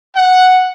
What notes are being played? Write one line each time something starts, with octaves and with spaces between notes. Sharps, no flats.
F#5